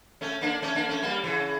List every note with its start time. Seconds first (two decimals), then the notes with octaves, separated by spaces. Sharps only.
0.21 A3 C#4
0.41 A#3 D4
0.62 A3 C#4
0.75 A#3 D4
0.89 A3 C#4
1.02 G3 A#3
1.24 C#3 E3